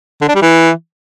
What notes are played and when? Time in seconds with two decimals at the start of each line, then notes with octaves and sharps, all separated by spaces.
0.21 D3
0.28 D4
0.35 G3
0.42 E3